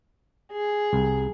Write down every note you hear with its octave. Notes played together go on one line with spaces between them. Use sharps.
G#4
C2